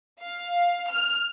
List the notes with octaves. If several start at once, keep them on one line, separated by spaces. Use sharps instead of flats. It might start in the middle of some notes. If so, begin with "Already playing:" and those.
F5
F6